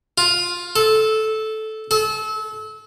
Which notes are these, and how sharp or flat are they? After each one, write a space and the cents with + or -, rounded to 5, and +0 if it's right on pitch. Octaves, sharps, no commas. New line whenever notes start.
F4 +10
A4 -10
A4 -30